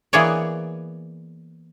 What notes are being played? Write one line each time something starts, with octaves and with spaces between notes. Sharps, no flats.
E3 A#3 B3 G#4 C#5 D5